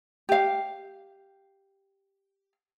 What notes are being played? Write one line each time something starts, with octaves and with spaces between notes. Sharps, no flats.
G4 F5